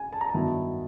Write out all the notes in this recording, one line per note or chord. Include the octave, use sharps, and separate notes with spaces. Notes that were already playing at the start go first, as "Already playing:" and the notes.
Already playing: G#5
A5
A#5
A5
G2 D#3 F#3 B3 E4